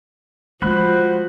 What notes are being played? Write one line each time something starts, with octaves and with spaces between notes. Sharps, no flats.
F3 G#3 F#4 C5 B5 F#6